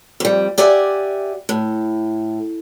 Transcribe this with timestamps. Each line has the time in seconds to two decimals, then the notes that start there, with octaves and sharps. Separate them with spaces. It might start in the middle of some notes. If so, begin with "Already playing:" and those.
0.20 F2 G3
0.58 G4 D5 E5 F#5 G#5
1.49 A2